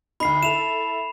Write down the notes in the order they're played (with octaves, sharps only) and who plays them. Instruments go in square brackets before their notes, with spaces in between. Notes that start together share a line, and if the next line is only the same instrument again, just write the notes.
[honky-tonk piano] D2 D#4 [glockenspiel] B5 C7
[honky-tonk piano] E4 A4 [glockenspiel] E7 F7